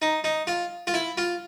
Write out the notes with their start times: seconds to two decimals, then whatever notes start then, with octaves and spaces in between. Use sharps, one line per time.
0.02 D#4
0.24 D#4
0.47 F4
0.87 F4
0.94 E4
1.18 F4